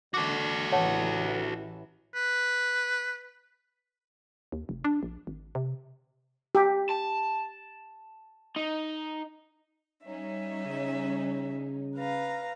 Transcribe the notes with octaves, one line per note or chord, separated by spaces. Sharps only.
D3 F#4 A4 D6
A1 E3 C#5 F#5 A5
B4
D#2
F1
D4
A#1
G#1
C3
G4
A5
D#4
G3 C#4 D#4 E5
C#3
B4 F5 A#5